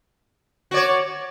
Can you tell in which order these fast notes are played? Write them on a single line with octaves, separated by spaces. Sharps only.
F#4 D5 C#5